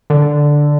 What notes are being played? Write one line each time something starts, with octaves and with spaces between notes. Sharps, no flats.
D3